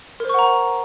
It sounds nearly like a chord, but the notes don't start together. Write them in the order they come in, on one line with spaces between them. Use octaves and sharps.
A#4 C5 C#6 F#5 A#5